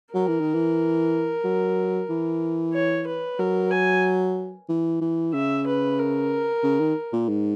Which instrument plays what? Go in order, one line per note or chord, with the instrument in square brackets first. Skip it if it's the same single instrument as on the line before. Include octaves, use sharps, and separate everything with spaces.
[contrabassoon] F#3 [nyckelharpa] A#4
[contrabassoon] E3
D#3
E3
F#3
E3
[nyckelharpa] C#5
B4
[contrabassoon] F#3 [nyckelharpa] A#4
[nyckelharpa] G#5
[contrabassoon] E3
E3
[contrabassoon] C#3 [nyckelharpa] E5
[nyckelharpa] B4
A#4
[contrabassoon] C#3
D#3
A#2
G#2